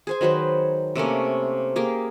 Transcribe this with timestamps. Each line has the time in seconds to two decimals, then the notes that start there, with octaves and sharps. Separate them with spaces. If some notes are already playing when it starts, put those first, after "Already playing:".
0.07 G#4 C5 G#5
0.21 D#3 F#3 B4 C5
0.95 C3 A3 A#3 C#4
1.76 A#3 G4 G#4